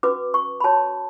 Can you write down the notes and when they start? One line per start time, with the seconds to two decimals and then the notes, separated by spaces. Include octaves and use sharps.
0.03 C#4 F#4 B4 D6
0.34 C#6
0.60 B5
0.64 F#4 C#5 A5